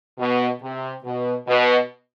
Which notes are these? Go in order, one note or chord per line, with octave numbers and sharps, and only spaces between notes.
B2
C3
B2
B2